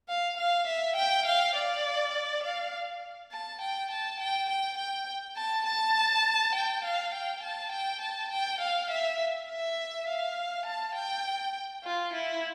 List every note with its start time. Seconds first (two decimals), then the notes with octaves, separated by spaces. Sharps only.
0.09 F5
0.37 F5
0.67 E5
0.96 G5
1.26 F5
1.55 D5
2.43 F5
3.32 A5
3.61 G5
3.91 A5
4.20 G5
4.49 G5
4.78 G5
5.37 A5
5.66 A5
6.55 G5
6.84 F5
7.14 G5
7.43 A5
7.72 G5
8.01 A5
8.31 G5
8.61 F5
8.90 E5
9.48 E5
10.08 F5
10.66 A5
10.95 G5
11.84 F4
12.13 E4